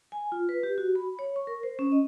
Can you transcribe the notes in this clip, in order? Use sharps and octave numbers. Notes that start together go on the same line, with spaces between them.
G#5
F4
B4
G4
F#4
B5
C#5
C#6
A#4
C5
C#4
D#5